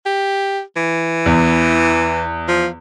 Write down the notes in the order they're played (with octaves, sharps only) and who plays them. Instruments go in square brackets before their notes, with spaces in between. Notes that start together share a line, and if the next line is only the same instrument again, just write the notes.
[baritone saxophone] G4
E3
[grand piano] E2
[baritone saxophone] F3